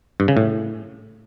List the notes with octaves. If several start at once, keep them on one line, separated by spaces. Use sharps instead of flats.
G2
C#3
A2